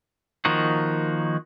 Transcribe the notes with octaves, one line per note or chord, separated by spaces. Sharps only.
D#3 F3 A#3 D#4 F#4